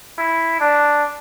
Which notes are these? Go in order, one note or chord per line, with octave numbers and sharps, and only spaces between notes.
E4
D4